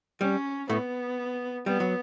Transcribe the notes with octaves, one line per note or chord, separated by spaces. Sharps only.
G3 C#4
A2 A3 B3
G3 B3
F#3